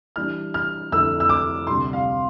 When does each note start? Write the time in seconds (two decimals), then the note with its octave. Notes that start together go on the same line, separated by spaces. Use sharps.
0.16 E3 G3 D4 F6
0.54 F6
0.92 F2 D3 A3 E4 E6
1.20 E6
1.29 D6
1.67 D2 C3 G3 C6
1.93 F5